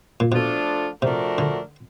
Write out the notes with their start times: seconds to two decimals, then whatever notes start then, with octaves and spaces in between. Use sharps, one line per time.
0.20 A#2
0.31 B2 F3 A3 D4 F4 A4
1.02 C3 F3 A3 D4 F#4 A#4
1.38 D3